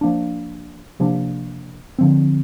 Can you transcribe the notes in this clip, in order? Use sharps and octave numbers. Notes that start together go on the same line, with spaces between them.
F3 A#3 D4
C3 F3 A#3 D4
D3 F3 C4